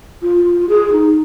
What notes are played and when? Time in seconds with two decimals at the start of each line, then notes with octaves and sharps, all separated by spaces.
0.22 F4
0.69 G#4
0.92 D#4